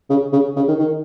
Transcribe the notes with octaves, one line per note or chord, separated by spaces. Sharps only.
C#3
C#3
C#3
D#3
D#3